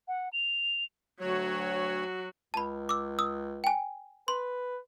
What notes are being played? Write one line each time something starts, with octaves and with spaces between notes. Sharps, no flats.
F#5
F7
D2 F#3 F#4 C#5
C#2 A5 B5
D6 E6
D#6 E6
G5 G#5
B4 C6